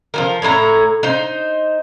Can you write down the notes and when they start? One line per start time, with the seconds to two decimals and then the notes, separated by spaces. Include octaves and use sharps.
0.14 F3 G3 A#4
0.42 A2 E4 C#5 A#5
1.03 D#4 C5